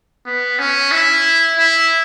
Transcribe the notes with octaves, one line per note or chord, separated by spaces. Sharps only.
B3
C#4
E4
E4